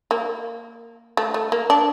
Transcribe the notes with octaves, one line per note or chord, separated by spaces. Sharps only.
A#3
A3
A3
A#3
D4